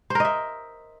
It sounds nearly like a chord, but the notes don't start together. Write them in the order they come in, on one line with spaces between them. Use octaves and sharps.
C5 A#4 D#5 E5